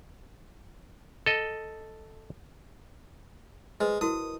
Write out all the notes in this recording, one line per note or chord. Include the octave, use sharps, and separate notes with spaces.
A4 D#5
G#3 B4 C5 D#5
E4 F#4 A#4 D#6